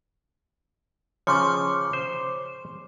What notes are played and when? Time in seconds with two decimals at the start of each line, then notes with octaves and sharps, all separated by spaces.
1.27 C#3 F3 C#5 C6 D6
1.93 C5